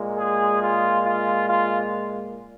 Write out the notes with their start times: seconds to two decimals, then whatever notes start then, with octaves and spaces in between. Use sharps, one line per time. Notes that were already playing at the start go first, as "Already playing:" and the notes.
Already playing: A#2 G#3
0.16 G#4
0.60 F4
1.04 F4
1.48 F4